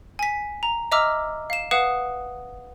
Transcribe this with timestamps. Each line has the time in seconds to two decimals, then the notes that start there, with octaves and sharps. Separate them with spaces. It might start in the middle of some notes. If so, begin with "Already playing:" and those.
0.19 G#5 B6
0.63 A#5
0.92 D#5 E5 A#5 D6 E6 F6
1.50 F5 E7
1.71 B4 F5 F#5 D#6 E7